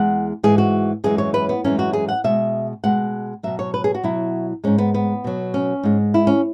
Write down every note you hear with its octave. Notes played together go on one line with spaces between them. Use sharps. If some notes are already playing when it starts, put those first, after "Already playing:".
Already playing: E2 G#3 F#5
G#2 E3 G#3 G#4
F#4
F#2 E3 G#3 G#4
C#5
B4
B3
F#2 E3 G#3 C#4
F#4
G#4
F#5
B2 G#3 E5
B2 G#3 F#5
B2 F#3 E5
C#5
B4
G#4
F#4
B2 F#3 E4
G#2 G#3 C#4
B3
B3
B2 F#3
C#4
G#2 G#3
E4
C#4